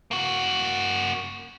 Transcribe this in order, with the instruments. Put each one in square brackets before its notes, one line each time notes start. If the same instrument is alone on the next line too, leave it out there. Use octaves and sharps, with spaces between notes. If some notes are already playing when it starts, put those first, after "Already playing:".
[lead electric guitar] A#3 F#4